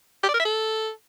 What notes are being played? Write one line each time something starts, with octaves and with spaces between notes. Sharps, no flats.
G4
D5
A#4
E5
A4